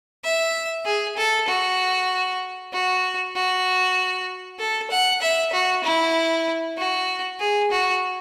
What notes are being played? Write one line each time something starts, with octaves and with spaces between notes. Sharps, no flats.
E5
G#4
A4
F#4
F#4
F#4
A4
F#5
E5
F#4
E4
F#4
G#4
F#4